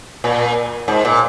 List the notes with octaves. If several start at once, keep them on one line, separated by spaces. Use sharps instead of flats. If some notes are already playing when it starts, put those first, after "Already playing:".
A#2
G#2
A#2